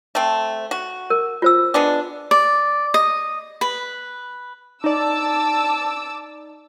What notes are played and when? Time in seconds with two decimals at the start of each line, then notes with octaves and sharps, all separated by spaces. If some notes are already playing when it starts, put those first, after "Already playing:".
0.15 A3 C4
0.71 F#4
1.10 A#4
1.42 F4 C5 E6
1.74 G#3 B3 D4
2.31 D5
2.94 D#5
3.61 B4
4.84 D#4 D5 A5 D6 E6